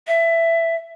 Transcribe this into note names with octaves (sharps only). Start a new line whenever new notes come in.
E5